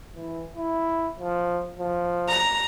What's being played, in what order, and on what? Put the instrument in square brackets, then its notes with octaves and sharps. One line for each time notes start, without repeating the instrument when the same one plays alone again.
[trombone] E3
E4
F3
F3
[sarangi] A#5